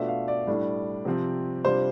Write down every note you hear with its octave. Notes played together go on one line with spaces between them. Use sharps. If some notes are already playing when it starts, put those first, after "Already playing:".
Already playing: B2 A3 D4 F4 E5
F5
D5
A2 G3 D4
C3 F3 C4
C3 G3 D4 F4 C5